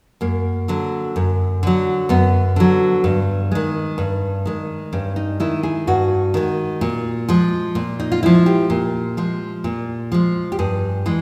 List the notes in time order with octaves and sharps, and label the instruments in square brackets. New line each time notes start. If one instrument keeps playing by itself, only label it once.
[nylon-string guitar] F#2 A#3
D3 F#3
F#2
D3 F#3
F#2 B3
D3 F#3
G2
D#3 G#3
G2
D#3 G#3
G2 C#4
D#4
D#3 G#3 E4
G#4
G2 F#4
D#3 G#3
A#2
F3 G#3
A#2
D#4
F4
F3 G#3 E4
G4
A#2
F3 G#3
A#2
F3 G#3
G4
G2 G#4
E3 G#3